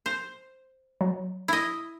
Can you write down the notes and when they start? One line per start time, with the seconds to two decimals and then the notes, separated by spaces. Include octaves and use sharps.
0.06 C5
1.01 F#3
1.48 E4 D#5